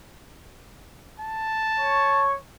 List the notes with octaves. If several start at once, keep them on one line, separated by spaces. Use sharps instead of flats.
A5
C#5 C#6